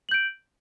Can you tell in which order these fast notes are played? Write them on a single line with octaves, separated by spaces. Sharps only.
F#7 G6 D7